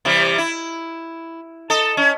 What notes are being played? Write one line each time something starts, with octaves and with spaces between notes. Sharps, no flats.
C3 E3 G3
E4
A4 D#5
C#4